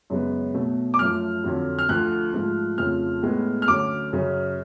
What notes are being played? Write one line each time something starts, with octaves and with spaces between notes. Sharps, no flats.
F#2 C#3 G#3 B3
B2 F#3 A3
D6
F#2 F3 A3 F6
F2 D3 F#3
F6
D2 D3 F3 F#6
G#2 F3 A3
F2 C#3 F3 A3 F6
A2 G#3 B3
F6
D2 D3 F#3 C#4 D6
F#2 C#3 F#3 C#4